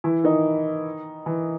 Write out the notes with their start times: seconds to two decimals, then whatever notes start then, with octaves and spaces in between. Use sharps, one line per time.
0.04 E3 E4
0.24 D#3 D#4
1.26 E3